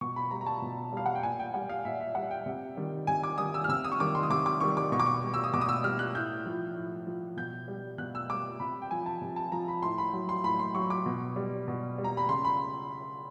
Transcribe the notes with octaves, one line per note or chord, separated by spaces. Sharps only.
B2 C#6
B5
G3 A#5
A#5
A5
B2
G3 F5
F#5
G5
A#2 G#5
G5
G3 F#5
F5
A#2 E5
E5
G3 F#5
G5
C3
D#3 G3
C3 G#5
D6
D#3 G3 D#6
E6
F6
C3 E6
D#6
C#6
D#3 G3 D6
C6
D#6
C3 D6
D6
D#3 G3 C#6
D6
B2 C#6
D6
C#6
G3
E6
D#6
B2 D6
D#6
E6
G3 F6
F#6
A2 G6
F3
A2
F3
B2 G6
G3
B2 F#6
E6
G3 D6
C3 B5
G5
F3 G#5
A5
C3
A5
F3 A#5
B5
A2 C6
B5
F#3
C6
A2 B5
C6
F#3 C#6
D6
B2
G3
B2
G3
A#5
B5
C#3 C6
B5